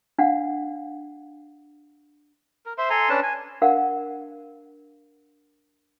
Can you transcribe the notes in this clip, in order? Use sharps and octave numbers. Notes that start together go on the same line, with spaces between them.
D4 F5 F#5
A#4
C5 E5 C6
A4 G#5 A#5 C6
C#4 D4 B4 A5
G#5
D4 A#4 F5 F#5